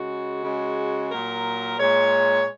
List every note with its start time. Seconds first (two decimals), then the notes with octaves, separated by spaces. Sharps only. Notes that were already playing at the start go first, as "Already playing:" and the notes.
Already playing: C#3 G#3 F#4
0.44 C#3 G#3
1.11 A#2 F#3 A#4
1.79 A#2 G#3 C#5